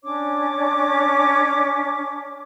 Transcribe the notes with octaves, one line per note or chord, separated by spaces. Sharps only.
C#4 D4 C#5 D6